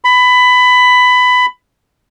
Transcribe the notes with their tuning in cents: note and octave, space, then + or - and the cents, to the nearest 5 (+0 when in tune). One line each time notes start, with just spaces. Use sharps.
B5 +15